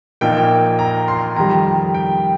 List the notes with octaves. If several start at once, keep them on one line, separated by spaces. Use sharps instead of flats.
A#1 A#2 A#3 D#4 G5
A#5
C6
F2 D#3 G3 A#5
G5